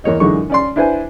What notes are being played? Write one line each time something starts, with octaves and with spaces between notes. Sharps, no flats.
E2 A#3 C#5 D#5
F#2 D3 E3 G#3 D#4 C#6
C#4 D5 C6
D4 E4 B4 C5 G#5